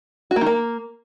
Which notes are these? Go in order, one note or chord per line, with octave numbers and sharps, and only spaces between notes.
F#4
A#3
D#3
A#3